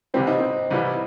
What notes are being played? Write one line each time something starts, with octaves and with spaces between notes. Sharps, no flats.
C2 C3 E3 G3 C4
D#4
C4
C2 C3 E3 G3